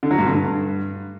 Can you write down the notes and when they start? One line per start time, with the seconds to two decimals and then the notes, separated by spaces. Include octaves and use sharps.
0.03 D3
0.11 F#3
0.19 G2
0.26 D3
0.34 G2